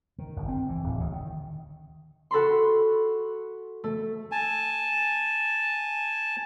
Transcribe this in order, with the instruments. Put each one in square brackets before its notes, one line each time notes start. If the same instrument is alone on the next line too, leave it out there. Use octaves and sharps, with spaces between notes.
[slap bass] D#3
G1
C4
E3
D1
D2
D#3
[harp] F#4 A4 B5 C6
A3
[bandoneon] G#5 A5